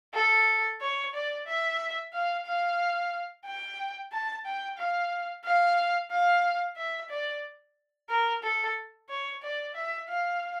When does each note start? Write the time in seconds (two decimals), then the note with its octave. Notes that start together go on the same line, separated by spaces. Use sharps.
0.15 A4
0.81 C#5
1.14 D5
1.47 E5
2.13 F5
2.46 F5
3.46 G5
4.11 A5
4.46 G5
4.78 F5
5.45 F5
6.11 F5
6.77 E5
7.10 D5
8.09 A#4
8.43 A4
9.09 C#5
9.42 D5
9.75 E5
10.08 F5